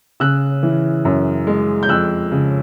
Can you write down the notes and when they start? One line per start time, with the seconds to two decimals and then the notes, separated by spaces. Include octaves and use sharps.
0.20 C#3 E6 F#6
0.63 E3
1.05 F#2
1.47 G#3
1.83 G6
1.89 F2 E6 F#6
2.32 C#3